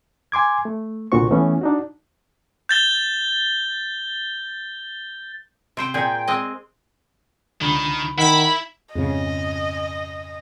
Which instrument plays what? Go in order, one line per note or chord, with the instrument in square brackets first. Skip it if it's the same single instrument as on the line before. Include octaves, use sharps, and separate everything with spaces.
[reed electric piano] G#5 C6 D6 G#6
A3
C2 A#2 D3 F#4 C5 C#6
E3 A3 B3 C#4
D4 D#4 F#4
[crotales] G6 A6 G7
[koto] C3 C5 G5
[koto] A#2 G#4 [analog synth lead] G5
[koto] G#3 C4 D#5
[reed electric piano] C#2 D3 B5 [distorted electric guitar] D#3
[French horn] D#3 [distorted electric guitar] E4 [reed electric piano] F#5 [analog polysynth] B5
[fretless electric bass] F2 G#2 C#3 [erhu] D#5